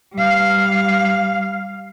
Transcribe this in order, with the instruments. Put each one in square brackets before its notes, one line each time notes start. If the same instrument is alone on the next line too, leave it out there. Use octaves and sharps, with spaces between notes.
[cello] G3 F5